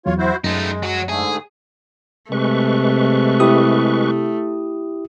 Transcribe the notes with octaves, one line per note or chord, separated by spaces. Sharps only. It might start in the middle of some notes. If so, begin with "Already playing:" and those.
E2 F#3 F4 C#5
E4 F#4 C5
F#2 G#3 A3 D#4
F#3 F#4
G#2 D3 A3 G#4
C3 G#3 A3 B4 C#6
E4 G4 D#6